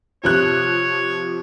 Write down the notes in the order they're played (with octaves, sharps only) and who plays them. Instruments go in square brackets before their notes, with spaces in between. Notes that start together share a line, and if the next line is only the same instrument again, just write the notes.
[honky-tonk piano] C3 F3 F#6 [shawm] C#5